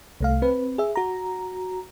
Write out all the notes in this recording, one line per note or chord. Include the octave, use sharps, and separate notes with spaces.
C2 A3 F5
C4 B4
G#4 E5
F#4 A#5